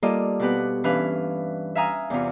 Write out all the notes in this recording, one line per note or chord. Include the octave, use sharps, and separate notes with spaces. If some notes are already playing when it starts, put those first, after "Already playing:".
G3 A#3 F4 A4 D5 D#5
B2 C4 G4 B4 F#5
G2 E3 C#4 D4 B4 F5
E5 F5 G#5 A#5 D#6 F6
E2 C3 F4